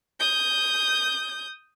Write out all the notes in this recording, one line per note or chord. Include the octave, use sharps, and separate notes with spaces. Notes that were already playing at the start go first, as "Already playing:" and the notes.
D#6 G6